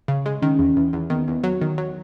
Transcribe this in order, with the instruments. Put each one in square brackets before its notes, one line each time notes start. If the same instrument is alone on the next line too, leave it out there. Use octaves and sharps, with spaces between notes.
[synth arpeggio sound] C#3
G#3
[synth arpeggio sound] D#3 [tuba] C#4
[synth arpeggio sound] E2
E2
E2
[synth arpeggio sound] D#3 [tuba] B3
[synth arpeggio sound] E2
F#3
D#3
F#3